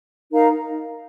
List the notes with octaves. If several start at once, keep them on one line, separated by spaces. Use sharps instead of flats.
D#4 A#4 F5 A#5